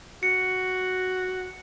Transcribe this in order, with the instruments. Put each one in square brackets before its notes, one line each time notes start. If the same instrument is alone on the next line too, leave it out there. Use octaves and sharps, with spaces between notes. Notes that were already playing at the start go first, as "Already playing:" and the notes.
[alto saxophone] F#4 [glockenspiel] C#7